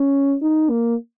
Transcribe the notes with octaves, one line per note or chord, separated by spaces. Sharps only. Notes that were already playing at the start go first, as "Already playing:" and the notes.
Already playing: C#4
D#4
A#3